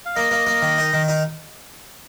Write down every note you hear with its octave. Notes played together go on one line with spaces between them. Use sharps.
F5
A#3 D#5
A#3
A#3
D#3
D#4
D#3
D#4